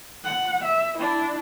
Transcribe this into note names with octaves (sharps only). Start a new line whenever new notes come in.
F#5
E5
D4 E4